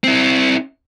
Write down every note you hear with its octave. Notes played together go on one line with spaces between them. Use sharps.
C4 E4